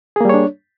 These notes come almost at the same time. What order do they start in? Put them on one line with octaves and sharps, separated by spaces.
G#4 A#3 G3 C#5 D4